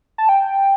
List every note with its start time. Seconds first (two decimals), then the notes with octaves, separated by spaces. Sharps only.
0.18 A5
0.29 G5